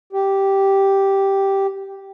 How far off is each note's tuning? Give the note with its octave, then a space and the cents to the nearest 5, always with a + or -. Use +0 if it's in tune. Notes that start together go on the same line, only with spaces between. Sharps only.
G4 -5